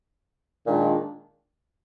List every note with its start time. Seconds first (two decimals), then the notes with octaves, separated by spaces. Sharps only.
0.66 A#2 D#3 G#3 D4 F4